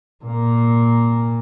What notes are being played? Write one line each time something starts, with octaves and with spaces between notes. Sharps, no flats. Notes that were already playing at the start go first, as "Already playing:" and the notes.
A#2 A#3